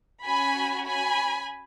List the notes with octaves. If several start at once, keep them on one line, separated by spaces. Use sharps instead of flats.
C#4 F#4 G#5 B5
G#5 B5